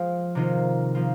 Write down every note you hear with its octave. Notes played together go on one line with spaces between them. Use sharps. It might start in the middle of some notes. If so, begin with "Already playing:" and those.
Already playing: F3 G#3 F4
C3 D#3 A#3 F4
F3 A#3 F4